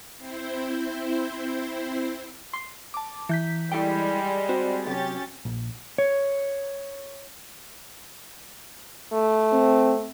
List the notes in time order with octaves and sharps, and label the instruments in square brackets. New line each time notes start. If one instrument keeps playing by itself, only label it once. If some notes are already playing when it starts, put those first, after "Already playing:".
[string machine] C4 E4 C5
[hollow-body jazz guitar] C6
[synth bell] A5 D6
E3 G6 B6
[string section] G3 G#3 [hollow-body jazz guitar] E4 A4 G5
[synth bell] C4 F#4 [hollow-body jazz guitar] C5
[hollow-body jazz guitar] F#2 C3 [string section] C#4 G4 A6
[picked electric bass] A#1
[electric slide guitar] C#5
[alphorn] A3
[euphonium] C4